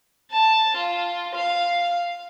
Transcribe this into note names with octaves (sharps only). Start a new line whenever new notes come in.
A5
F4
F5